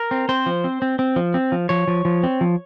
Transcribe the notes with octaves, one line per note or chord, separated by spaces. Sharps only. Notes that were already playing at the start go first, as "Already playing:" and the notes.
Already playing: A#4
C4
C4 C5
F3
C4
C4
C4
F3
C4
F3
F3 C#5
F3
F3
C4
F3